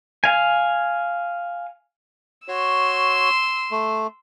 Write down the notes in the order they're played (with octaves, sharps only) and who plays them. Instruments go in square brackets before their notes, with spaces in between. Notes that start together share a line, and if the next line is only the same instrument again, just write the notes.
[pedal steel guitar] F5 G#5
[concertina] F#4 C#5 [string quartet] C6 E6
[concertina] A3